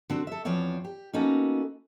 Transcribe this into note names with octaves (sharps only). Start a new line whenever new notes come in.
D3 C4 F#4
A4 E5
E2 F3 C4 C#5 D5
G4
A#3 B3 C#4 D#4 F#4 A4